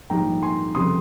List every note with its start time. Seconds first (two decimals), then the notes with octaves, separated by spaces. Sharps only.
0.10 A#1 G#2 D#3 G3 G5 A#5
0.43 G#5 C6
0.75 F1 F2 C#3 G3 C6 D#6